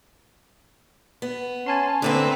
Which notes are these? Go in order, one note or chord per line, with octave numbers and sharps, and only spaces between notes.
B3
C#4 G#5 A5 C6
D2 D3 A#3 C4 B4